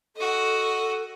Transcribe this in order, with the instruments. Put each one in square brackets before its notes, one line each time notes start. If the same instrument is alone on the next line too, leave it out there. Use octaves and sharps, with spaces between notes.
[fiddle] F#4 D#5 [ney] A4